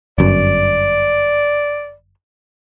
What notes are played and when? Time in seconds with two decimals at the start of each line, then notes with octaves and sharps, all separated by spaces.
0.18 G1 F#2 D5